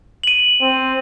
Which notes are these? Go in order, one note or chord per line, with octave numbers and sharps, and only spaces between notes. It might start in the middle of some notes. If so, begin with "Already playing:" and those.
D#7 F#7
C4